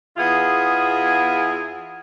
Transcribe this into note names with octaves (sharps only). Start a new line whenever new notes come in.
E2 B3 E4 F4 G#4